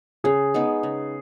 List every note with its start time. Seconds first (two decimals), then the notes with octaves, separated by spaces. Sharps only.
0.24 C#3 G#4
0.54 G#3 B3 D#4
0.83 C#3